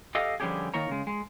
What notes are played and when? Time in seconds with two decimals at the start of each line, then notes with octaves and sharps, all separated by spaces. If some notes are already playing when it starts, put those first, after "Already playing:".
0.15 G4 A4 D#5 F5
0.40 D3 F3 G3 C#4 G4 G#4
0.74 D#3 A#3 A#4 C#5 A#5
0.89 C#3 G#3
1.07 G#3